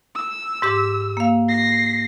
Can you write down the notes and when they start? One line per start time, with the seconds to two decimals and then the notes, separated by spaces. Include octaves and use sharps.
0.15 E6
0.62 G#2 G4 D6
1.17 A#3 F5
1.49 A#6 C7